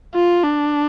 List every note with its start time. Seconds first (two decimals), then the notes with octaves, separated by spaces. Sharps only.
0.15 F4
0.44 D4